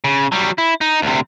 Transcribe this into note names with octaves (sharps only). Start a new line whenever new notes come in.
C#3
F#3 G3
E4
D#4
D2 C3